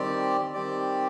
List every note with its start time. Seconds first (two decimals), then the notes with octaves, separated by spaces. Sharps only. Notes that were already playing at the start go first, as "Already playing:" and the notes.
Already playing: D#3 G3 C4 G4 D5
0.54 D#3 G3 C4 G4 D5